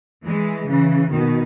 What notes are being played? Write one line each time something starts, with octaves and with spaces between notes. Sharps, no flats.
E3 G#3
C#3 E3
B2 D#3